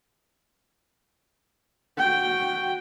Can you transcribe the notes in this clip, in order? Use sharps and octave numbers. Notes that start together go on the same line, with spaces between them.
F#4 G5